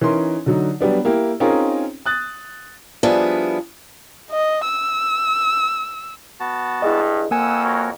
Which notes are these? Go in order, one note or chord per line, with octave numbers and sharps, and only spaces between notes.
E3 C#4 D#4 A#4 C6
D3 F#3 D#4
F#3 G3 B3 D4
A#3 E4 G4
C4 C#4 D#4 F4 G#4 A#4
D#6 F#6 A6
F3 G3 B3 D4 E4 G#4
D#5
E6
B3 F#4 A5
G2 E4 G#4 D#5
F2 A#3 F#5 G#5 D#6 E6
F#4 A#4 C#5